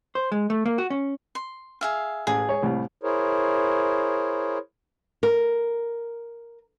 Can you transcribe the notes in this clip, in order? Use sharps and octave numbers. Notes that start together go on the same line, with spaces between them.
C5
G#3
A3
A#3
F#4
C#4
C6
G#4 E5 F5
A1 G#4
C#5
C2 A2
E4 G#4 A#4 C5 C#5
A#4